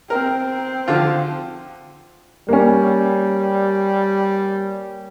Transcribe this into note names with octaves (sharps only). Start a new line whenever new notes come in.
C4 A#4
D3 F3 F4
G3 A#3 C#4